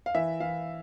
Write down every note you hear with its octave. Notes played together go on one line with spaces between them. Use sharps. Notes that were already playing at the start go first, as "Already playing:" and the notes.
F5
E3 E5
E3 F5